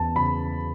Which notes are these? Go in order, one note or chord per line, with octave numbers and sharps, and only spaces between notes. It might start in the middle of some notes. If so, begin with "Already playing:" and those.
Already playing: E2 A5
C#3 B5